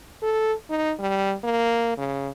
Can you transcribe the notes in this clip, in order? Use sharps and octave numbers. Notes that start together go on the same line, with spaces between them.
A4
D#4
G3
A#3
C#3